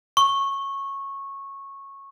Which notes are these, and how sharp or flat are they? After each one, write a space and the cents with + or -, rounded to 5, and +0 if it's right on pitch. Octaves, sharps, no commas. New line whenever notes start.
C#6 -15